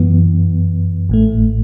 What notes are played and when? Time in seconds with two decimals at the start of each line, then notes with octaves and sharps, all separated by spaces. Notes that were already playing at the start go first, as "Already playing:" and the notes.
Already playing: F#2 E3 B3
1.09 A1 A2 A3